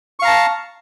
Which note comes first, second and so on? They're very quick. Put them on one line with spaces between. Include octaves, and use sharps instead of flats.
C#6 F5 A#5 A5